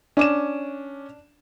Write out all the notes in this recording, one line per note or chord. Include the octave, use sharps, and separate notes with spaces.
C#4 D4 D6 E7